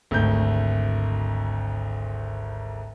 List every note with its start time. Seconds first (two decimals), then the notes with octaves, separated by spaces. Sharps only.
0.11 G#1 D2 A3 G6